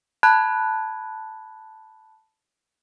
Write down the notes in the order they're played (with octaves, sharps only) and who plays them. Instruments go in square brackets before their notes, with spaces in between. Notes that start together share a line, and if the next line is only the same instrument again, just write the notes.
[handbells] A5 B5 F#6 G#6